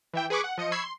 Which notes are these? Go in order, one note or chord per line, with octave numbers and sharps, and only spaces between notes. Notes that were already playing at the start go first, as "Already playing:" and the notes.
E3 E5 G5
G#4 B4 B5 C#6 D6
F#5
F3 D#5 C#7 D#7
B5 C#6 E6 G#6 C7
C6